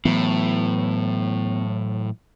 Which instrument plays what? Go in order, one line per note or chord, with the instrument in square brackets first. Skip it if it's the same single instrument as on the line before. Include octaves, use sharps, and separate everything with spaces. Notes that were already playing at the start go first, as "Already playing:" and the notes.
[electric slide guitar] A2 [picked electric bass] E3 F#3 [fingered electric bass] B3